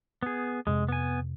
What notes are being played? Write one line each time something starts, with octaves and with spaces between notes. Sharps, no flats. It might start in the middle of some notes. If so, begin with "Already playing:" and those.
B3 G#4
F2 C3 G#3
B3 G#5